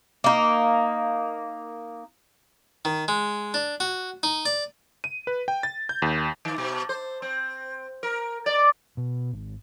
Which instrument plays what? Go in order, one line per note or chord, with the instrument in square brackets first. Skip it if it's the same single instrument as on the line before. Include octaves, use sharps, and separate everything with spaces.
[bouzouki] A#3 D#4
[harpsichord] D#3
G#3
D4
F#4
D#4
D5
[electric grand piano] D#7
B4
G5
A6
G6
D#2
[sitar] D#3
B2
C5
C4
A#4
D5
[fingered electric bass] B2
G#1